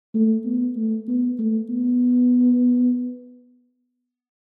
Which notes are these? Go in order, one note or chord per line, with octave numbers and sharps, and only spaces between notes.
A3
B3
A3
B3
A3
B3